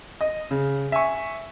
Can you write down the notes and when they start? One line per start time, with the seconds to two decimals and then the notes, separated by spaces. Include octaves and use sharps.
0.21 D#5
0.51 C#3
0.92 E5 G#5 C#6